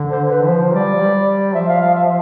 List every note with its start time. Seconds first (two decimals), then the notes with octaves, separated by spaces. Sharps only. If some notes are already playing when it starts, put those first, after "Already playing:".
Already playing: D3
0.10 C5
0.29 B4
0.47 F3 C5
0.74 G3 D5
0.95 F3
1.00 G3
1.54 F3 E5
1.68 F5
1.82 F5
1.95 E5